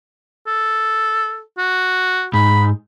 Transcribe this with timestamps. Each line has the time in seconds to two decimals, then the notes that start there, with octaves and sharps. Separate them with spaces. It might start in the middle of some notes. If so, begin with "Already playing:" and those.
0.47 A4
1.58 F#4
2.33 G#2 B5